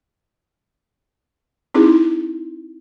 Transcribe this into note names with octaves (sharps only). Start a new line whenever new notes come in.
C4 D#4 E4 G#4